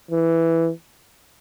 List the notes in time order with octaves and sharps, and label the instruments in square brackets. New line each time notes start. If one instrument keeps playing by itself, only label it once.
[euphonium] E3